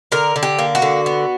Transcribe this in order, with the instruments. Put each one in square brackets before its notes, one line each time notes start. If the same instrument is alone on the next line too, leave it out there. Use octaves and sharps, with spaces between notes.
[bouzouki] D3 A#4
D3
G4
A#3
F#4
D3
B3